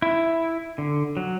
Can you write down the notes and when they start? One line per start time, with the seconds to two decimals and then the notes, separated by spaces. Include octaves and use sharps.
0.02 E4
0.78 D3
1.17 F#3